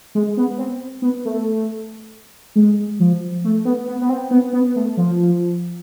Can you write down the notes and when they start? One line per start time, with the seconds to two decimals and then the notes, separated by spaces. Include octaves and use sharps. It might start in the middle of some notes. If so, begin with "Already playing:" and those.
0.15 G#3
0.37 B3
0.58 C4
1.02 B3
1.25 A3
2.55 G#3
3.00 F3
3.44 A3
3.65 B3
3.88 B3
4.01 B3
4.09 C4
4.31 B3
4.53 B3
4.76 A3
4.97 F3